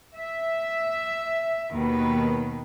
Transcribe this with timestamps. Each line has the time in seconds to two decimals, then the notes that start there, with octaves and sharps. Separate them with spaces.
0.16 E5
1.74 D#2 B2 D#3 B4